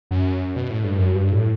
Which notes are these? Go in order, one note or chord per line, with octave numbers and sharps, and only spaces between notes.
F#2
B2
A2
G2
F#2
G2
A2